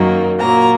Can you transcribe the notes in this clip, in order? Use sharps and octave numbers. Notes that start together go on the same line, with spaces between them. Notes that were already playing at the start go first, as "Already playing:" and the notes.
Already playing: F#2 D#3 F#3 A#3
A#2 F#3 A#3 A#5